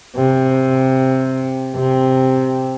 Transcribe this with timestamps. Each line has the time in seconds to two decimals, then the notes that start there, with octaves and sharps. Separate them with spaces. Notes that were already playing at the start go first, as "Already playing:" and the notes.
0.16 C3
1.75 C3